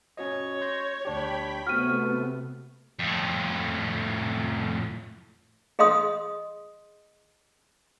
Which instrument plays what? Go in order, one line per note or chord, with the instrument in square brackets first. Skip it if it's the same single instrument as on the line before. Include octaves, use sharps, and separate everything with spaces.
[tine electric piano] C#4 F#4 D#5 [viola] C#5
[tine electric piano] C6 G6 A#6
[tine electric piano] D2 D4 G4 [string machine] G5 B5 B6
[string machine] C3 A3 B3 [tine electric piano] C4 F#4 [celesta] F6 D#7
[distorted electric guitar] F2 A2
[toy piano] G#4 D#5 F5 C6 D#6